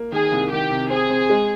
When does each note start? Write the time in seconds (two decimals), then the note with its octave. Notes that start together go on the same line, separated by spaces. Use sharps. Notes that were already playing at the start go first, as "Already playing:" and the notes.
Already playing: A#3
0.12 D#3 G#4
0.32 C2
0.51 D#3 G4
0.71 C3
0.90 C4 G#4
1.10 C4
1.30 G#3